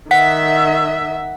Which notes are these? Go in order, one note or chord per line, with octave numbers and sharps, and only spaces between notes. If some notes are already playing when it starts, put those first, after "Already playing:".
D#3 E5 F#5 B6